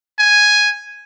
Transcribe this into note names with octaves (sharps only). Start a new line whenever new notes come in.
G#5